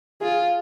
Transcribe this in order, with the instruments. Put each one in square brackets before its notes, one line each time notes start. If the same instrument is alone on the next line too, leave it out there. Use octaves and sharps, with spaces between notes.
[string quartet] F4 [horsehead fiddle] G#4